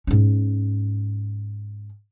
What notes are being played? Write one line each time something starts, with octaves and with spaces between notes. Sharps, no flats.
G#2 C#4